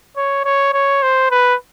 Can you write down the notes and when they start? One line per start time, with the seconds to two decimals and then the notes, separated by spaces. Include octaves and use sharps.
0.17 C#5
0.45 C#5
0.73 C#5
1.03 C5
1.31 B4